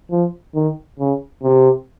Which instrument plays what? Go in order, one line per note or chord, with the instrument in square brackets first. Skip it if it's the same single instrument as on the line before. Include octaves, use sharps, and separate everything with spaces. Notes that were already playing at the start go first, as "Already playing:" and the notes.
[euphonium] F3
D#3
C#3
C3